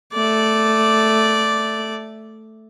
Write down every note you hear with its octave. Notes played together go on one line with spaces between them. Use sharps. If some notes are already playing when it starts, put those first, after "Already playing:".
A3 D5